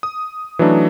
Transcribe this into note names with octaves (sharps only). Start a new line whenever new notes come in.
D#6
E3 F#3 A3 D4 D#4